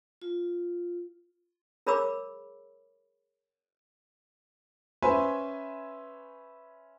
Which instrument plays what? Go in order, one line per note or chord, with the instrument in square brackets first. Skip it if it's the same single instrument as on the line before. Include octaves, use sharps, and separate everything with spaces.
[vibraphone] F4
[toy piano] G#4 A#4 C#5 B5 D6 E6
[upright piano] C#4 B4 C5 E5 G#5 C6